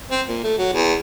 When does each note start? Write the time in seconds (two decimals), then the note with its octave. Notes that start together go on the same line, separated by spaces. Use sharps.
0.11 C4
0.28 A#2
0.43 A3
0.58 F#3
0.73 E2